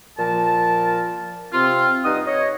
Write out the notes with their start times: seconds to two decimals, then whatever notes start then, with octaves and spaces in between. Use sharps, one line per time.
0.18 A#2 F3 A#4 A5
1.52 C3 C4 F4
2.04 G2 D#4 D#5 F#5 D#6
2.26 C#5 D#5